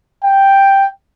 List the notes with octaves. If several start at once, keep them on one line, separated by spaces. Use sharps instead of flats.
G5